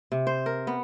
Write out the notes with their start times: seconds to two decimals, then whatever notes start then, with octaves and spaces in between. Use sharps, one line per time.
0.12 C3
0.27 C5
0.46 A#4
0.67 B3